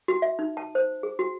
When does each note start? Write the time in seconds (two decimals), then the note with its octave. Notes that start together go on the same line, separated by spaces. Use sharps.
0.08 F#4
0.22 E5
0.39 D#4
0.57 A5
0.75 C5
1.03 G#4
1.19 F#4